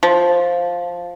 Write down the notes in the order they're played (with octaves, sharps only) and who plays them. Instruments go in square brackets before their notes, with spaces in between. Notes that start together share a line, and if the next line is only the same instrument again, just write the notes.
[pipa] F3